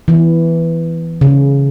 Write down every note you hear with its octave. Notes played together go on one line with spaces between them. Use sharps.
E3
C#3